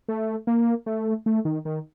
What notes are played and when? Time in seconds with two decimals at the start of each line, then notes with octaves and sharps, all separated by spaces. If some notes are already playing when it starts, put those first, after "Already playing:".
0.08 A3
0.47 A#3
0.86 A3
1.26 A3
1.45 D#3
1.65 D#3